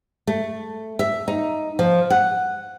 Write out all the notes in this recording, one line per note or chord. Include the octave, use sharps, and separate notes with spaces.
A3
E5
D#4
F3
F#5